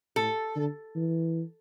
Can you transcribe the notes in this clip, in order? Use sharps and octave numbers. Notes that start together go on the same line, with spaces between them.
A2 A4
D3
E3